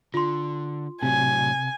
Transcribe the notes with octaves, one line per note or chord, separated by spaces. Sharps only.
D3 F4 C6
A2 C3 F#3 G#5